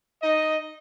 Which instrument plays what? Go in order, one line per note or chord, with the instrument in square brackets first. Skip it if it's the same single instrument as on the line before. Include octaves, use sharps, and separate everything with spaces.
[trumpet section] D#4 D#5